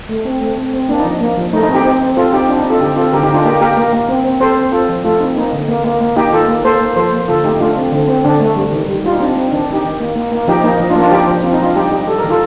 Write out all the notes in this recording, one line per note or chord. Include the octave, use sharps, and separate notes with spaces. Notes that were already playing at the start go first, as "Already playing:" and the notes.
A3
C4
A3
C4
C4
A#3 D4
D#4
F3
A#3
F3
A3 D#4
D#4
C4
D#4 G4
C4
C4
C4 F4 A4
C4 D#4 G4
C4 D4 F4
D#4
C4
F4 A4
D3 D#4 G4
C4 F4 A4
D3 G4 A#4
D#4 G4
D3
D4 F4
A#3 D#4 G4
A#3 G4 A#4
A#3
A#3
C4
C4
C4 A4 C5
C4
C4 F4 A4
F3
A3 F4 A4
C4 D#4
A#3 D#4
D3
A#3
A#3
A#3
A#3 D#4 G4
D#3 F4 A4
A#3
A#3 A4 C5
A#3
F3 A4 C5
A#3
D3 F4 A4
A3 D#4 G4
A3 D4 F4
C4
D3
C4
D3 D4
A3
G3
D#3
G3
G3 F4
D#4
C4 D4
C4 D#4
D#3 D4
D#3
D#4 G4
D#3
A#3
A#3
A#3
F3 D#4 G4
A#3 D#4
F3 D#4
D4 F4
A#3
D4 F4
F3 D#4 G4
F3
C4 F4
D#4
F3 D4 F4
G3 D#4 G4
G3 D#4 G4
G3 A4
D#3 A#4
F4 A4